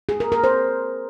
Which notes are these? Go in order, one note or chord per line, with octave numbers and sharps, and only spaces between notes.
G#4
A#4
A#4
C5